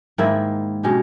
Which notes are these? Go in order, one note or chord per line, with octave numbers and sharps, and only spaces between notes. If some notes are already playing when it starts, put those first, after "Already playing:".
G#2 D#3 A#3 E4
B2 G#3 C#4 G4